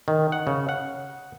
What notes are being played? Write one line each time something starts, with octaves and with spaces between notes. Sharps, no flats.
D#3
F#5
C#3
F#5